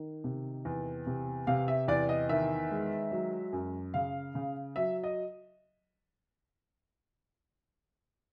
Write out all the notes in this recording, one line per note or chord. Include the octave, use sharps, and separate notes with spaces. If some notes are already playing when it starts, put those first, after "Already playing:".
Already playing: D#3
C3
E2
C3
C3 F5
E5
E2 D5
D#5
D#3 E5
G#3
F#3
F#2
C#3 F5
C#3
F#3 E5
D#5